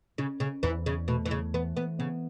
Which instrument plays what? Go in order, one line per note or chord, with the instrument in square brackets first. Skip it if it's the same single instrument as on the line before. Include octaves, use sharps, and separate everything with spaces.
[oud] C#3 [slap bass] C#4
[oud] C#3
[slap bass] E2 [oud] E3
[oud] C#3
[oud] B2 [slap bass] A3
[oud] E3
C#3
[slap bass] E3 [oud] B3
[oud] B3
[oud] C#3 [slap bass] B3